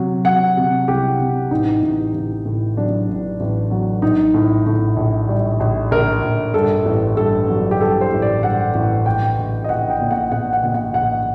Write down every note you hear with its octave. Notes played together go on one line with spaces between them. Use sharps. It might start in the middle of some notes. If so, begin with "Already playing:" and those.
Already playing: C3 F#3
F#3 F#5
C3
C2 G4
C3
A1 D#4
A1
A1
A2
F#3 D4
A1
A1
F#3
A#1 D#4
A2
A2
A#1
G3
A#1
A#1 A#4
A#1
G2 A4
A1
G2 A4
F#3
G4
G2 A4
C5
A1
D5
G2 F#5
A1
A#1 G5
A#1
D#5
A#1 F#5
G5
A#2
F#5
A#2 F#5
F#5
A#2
F#5
A#1 F#5